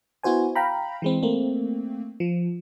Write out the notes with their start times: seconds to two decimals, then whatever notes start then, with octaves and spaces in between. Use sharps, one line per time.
0.23 B3 E4 F#4 C5 G#5
0.56 F5 G5 A#5 B5
1.02 E3 G#3 C4
1.23 A3 A#3 C4
2.20 F3